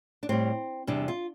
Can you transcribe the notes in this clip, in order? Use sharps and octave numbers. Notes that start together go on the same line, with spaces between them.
D4
A2 G3 C4
E2 C3 G3 D4
F4